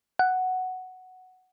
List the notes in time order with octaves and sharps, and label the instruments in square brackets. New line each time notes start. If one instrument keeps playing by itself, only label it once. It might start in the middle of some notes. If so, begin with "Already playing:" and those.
[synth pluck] F#5